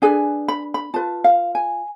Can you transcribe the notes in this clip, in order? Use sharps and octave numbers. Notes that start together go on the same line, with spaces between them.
D4 G#4 B4 G#5
B5
B5
F4 B4 A5
F5
G#5